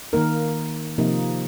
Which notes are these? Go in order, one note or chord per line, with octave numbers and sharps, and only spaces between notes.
D#3 A#3 D#4 A#4
C3 F3 A#3 D#4